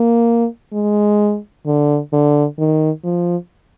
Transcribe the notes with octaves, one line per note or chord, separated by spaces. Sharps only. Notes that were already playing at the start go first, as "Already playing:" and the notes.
Already playing: A#3
G#3
D3
D3
D#3
F3